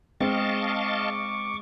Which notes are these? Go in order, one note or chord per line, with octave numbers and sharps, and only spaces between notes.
G#3 C4 D#5 F5 A5 C#6 D6